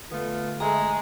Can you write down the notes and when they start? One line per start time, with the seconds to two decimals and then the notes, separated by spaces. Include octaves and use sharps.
0.11 D3 A3 B3 F4
0.60 G#3 A3 A#5